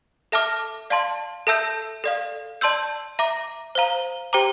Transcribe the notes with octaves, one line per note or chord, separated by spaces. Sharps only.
A4 E5 A5 D6 F6
D5 F5 A5 C6
A4 E5 A5 E6 G6
A4 D5 F5
D5 A5 C6 E6 G6
E5 A#5 D6
C5 F5 A#5
G4 C5 G5 A#5 D6